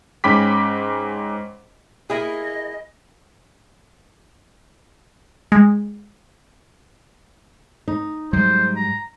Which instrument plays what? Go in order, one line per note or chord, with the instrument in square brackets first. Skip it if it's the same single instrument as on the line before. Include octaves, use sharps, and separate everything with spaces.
[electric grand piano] G#2 C#4 G5 B5 D6 B6
[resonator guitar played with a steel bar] A#3 E4 G#4 [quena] D#5
[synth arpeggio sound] G#3
[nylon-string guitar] D#4
[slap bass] G#2 F#3 G3 [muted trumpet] C5
[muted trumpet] A#5